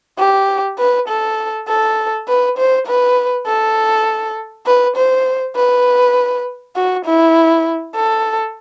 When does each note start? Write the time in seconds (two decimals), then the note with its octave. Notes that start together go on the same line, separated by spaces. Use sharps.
0.19 G4
0.79 B4
1.08 A4
1.68 A4
2.28 B4
2.58 C5
2.87 B4
3.47 A4
4.66 B4
4.96 C5
5.55 B4
6.76 F#4
7.05 E4
7.95 A4